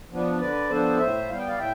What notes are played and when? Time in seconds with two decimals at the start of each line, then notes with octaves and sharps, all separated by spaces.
0.11 F3 B3 D4
0.40 D3 B4 D5
0.70 F3 B3 D4 A4 C5
0.99 A2 C5 E5
1.29 G3 B3 F5
1.38 G5
1.47 D5 F5
1.58 A2 E5 G5